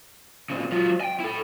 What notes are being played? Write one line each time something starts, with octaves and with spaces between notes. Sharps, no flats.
A#2 C#3
F#3 F4
G5 G#5
E4 A4